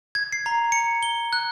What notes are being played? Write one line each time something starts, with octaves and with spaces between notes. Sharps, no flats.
G#6
C7
A#5
C#7
G7
F#6